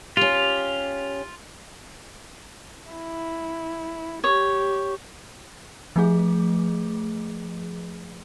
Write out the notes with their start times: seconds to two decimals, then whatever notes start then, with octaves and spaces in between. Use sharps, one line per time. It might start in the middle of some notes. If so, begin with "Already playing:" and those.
0.17 C#4 F4 G4
2.91 E4
4.24 G4 C#5
5.96 F3 A3 G#4